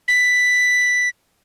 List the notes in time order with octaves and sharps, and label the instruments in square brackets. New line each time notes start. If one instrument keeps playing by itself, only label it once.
[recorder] B6